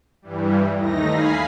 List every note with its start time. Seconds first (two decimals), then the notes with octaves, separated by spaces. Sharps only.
0.22 G2 E3 G3
0.75 D#2 A3 D#4 A#6
1.07 F5 G#5 B5 C7